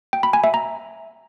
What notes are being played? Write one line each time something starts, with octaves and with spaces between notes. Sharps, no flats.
G5
B5
G#5
E5
A#5